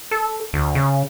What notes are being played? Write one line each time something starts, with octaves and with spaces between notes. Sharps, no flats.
A4
D2
C#3